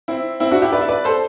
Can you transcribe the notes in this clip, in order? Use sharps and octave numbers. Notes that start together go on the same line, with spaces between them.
C4 E4
C4 E4
D4 F#4
E4 G4
B4 D5
E5
B4 D5
A4 C5